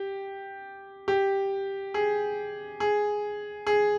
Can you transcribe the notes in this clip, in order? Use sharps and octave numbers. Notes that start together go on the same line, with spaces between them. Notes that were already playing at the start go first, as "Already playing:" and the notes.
Already playing: G4
G4
G#4
G#4
G#4